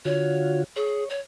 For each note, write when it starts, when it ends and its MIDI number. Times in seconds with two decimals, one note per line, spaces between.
0.05 0.64 50
0.05 0.64 65
0.05 0.64 66
0.05 0.61 73
0.76 1.04 68
0.76 1.09 73
1.10 1.20 73